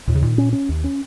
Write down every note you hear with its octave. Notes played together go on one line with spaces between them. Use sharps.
D#2 A#2
C#3
A#2 D#3
C#4
C#4
D#2
C#4